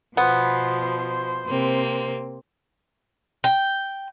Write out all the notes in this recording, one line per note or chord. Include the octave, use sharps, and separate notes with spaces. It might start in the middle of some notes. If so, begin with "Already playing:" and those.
B2 F3 B3 C5
C3 A#3 C4
G5